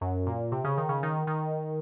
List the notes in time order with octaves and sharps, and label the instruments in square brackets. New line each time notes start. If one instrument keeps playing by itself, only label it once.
[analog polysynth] F#2
A#2
C3
C#3
D#3
C#3
D#3
D#3